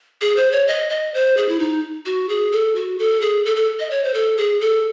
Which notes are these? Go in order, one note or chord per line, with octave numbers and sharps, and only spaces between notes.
G#4
C5
C#5
D#5
D#5
C5
G#4
E4
D#4
F#4
G#4
A4
F#4
A4
G#4
A4
A4
D#5
C#5
C5
A4
G#4
A4